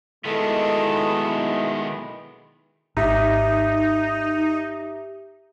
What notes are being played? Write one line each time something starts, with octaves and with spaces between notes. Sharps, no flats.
B2 D#3 G#3 B3 D#4 E4 A4 D#5
G#1 D#4 G4 E5 A#5